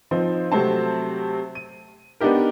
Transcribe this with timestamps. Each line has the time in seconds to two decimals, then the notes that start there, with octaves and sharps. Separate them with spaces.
0.11 F3 C4 D#4
0.52 C3 F#3 A3 C4 A5
1.55 D#7
2.20 B3 D4 D#4 G4 A#4